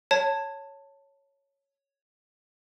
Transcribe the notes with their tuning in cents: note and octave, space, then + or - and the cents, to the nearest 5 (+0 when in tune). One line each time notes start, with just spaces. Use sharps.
C#5 +0 A5 +15